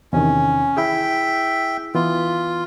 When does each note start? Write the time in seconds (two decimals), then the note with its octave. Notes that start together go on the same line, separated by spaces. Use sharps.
0.13 E2 C3 D#3 C#4
0.77 E4 G#4 E5 G5
1.95 E3 B3 F4